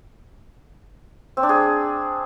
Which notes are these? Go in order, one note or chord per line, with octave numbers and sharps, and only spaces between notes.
C4
D4
G#4